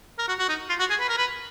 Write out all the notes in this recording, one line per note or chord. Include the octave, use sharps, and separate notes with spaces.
A#4
F#4
F#4
D#4
F4
F#4
G#4
B4
A#4
B4